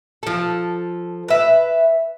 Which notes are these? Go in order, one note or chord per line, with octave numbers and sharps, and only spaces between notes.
F3 A4
B4 E5